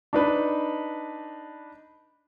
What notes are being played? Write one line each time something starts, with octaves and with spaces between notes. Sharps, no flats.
D4 D#4 B4